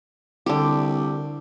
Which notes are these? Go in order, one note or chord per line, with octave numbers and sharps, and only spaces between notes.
C2 D3 G4